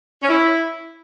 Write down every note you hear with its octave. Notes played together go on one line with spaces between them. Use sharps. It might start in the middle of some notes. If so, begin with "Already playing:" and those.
C#4
E4